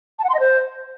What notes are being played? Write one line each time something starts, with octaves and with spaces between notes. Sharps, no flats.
A5
F#5
C6
D#5
C5